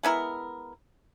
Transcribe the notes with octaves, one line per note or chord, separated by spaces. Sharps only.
G#3 B3 E4 A#4